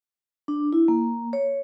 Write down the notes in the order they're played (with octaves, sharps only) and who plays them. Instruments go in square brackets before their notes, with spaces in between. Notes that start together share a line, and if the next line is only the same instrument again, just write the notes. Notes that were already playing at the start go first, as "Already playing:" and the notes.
[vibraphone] D4
E4
A#3
C#5